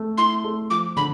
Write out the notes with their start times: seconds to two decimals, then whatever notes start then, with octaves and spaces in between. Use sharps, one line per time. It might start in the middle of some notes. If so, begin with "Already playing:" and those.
Already playing: A3
0.18 E4 C6
0.44 A3
0.70 F3 D6
0.96 D3 B5